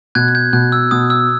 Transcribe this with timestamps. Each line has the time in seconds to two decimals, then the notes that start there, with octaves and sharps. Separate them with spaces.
0.15 B2 F#6 G#6
0.28 F#6
0.35 G6
0.53 B2 F#6
0.72 E6
0.91 B2 D#6
1.10 E6